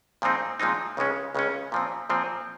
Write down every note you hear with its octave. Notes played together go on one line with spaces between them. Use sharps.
A#2 F3 G#3 C4 D#4
A#2 F3 G#3 C4 D#4
C#2 C#3 G#3 C#4
C#2 C#3 G#3 C#4
A#2 F3 C4
A#2 F3 C4